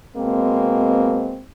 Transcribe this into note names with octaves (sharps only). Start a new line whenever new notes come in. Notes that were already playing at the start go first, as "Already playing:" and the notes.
B2 G#3 A#3 C4